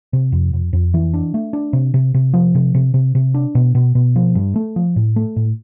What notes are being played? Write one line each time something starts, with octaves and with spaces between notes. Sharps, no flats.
C3
F2
F2
F2
E3
D4
A3
D4
C3
C3
C3
F3
C3
C3
C3
C3
D4
B2
B2
B2
F3
G2
A3
F3
A2
A3
A2